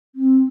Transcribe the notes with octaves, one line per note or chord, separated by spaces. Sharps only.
C4